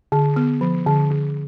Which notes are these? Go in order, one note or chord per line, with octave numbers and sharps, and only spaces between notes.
D3
B3
F3
D3
D3